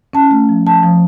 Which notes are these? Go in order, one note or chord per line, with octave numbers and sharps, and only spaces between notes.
C#4 A5
A3
F3
F3 A5
F3